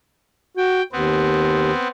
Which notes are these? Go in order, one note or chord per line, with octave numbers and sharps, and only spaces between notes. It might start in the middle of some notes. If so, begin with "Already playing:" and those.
F#4 G5
D#2 B3 C4